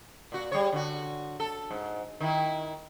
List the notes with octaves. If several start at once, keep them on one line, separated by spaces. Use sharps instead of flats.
A#2 F#4
G3 G#4 C#5
D3 F#4
A4
G#2
D#3 E4